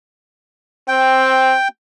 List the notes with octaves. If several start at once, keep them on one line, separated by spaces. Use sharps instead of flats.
C4 G5